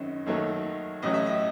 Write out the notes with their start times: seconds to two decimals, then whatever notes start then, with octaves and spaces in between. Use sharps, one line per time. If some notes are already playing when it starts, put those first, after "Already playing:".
Already playing: G#1 F#2 D#3 G#3 C#4
0.26 D#2 D#3 F#3 A3 C#5
1.02 A1 A2 F#3 C#4 D#5
1.14 E5
1.26 D#5